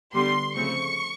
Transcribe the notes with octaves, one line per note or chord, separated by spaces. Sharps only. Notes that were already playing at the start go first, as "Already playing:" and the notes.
D3 G3 B3 C6
C#3 F3 A3 C4 C#6